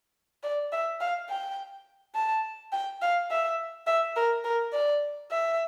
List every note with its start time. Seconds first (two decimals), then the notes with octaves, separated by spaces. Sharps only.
0.43 D5
0.72 E5
1.00 F5
1.29 G5
2.15 A5
2.72 G5
3.02 F5
3.31 E5
3.87 E5
4.16 A#4
4.44 A#4
4.73 D5
5.31 E5